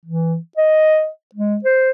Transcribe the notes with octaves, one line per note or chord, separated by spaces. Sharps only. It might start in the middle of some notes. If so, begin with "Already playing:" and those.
E3
D#5
G#3
C5